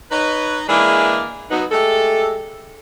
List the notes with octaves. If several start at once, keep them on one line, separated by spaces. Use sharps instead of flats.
D#4 B4 C#5
E3 G#3 A#3 D4 E4 G#4
F#3 B3 D#4
G#3 A3 G4 A4